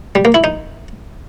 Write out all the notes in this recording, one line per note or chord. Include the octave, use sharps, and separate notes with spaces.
G3
A#3
E4
D#4